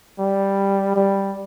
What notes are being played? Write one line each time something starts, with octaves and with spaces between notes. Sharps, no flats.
G3
G3